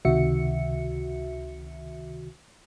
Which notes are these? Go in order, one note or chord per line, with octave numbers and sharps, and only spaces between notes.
C#2 C3 D#3 F#4 E5 C#7